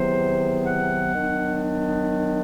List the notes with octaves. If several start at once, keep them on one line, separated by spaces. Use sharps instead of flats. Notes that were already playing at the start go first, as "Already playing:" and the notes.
Already playing: E2 C3 D#3 F#3 B3 C5
F#5
D#3 F#3 B3 D4